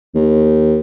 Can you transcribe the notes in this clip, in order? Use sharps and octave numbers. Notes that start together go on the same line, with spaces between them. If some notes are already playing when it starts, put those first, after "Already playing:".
D#2